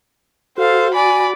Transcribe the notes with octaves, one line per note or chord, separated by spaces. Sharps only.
F#4 A4 C5 F5
D5 G#5 B5